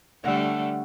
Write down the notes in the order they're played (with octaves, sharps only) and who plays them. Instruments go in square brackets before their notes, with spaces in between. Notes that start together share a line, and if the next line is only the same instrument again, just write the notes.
[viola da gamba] D3 G3 A3 [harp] C#5 F#5